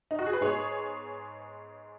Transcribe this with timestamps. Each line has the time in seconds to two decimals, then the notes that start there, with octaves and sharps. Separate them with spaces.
0.11 D#4
0.19 F#4
0.26 G#4
0.33 B4
0.41 G#2 G#3 B3 G#4 C#5